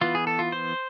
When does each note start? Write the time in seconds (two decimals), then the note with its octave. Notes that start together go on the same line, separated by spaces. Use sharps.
0.01 E3 B3 F4
0.15 G#4
0.27 A4
0.39 F4
0.52 C5